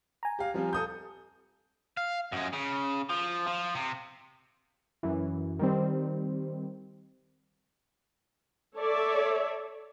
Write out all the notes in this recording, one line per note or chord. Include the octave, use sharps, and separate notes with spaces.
G#5 A#5
G4 F5
F3 G3 C4
A4 D#6 G6
F5
F#2 G#3
C#3
F3
F3
C3
F#2 E3
D#3 G3 C4
A4 C#5 D5 E5